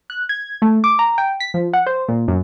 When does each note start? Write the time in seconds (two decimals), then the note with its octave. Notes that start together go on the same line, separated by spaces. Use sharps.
0.10 F#6
0.29 G#6
0.62 A3
0.84 D6
0.99 A#5
1.18 G5
1.40 B6
1.54 F3
1.73 F#5
1.86 C5
2.08 A#2
2.28 F#2